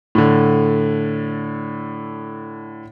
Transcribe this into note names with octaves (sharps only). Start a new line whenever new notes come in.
A2 D3